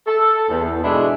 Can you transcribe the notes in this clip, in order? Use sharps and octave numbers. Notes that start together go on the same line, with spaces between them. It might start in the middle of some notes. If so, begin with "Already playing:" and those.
A4
E2
G#2 B2 D3 G#3 D4 E4